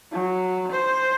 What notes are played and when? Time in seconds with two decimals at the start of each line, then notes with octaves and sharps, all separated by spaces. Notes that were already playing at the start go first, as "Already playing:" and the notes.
0.12 F#3
0.72 C5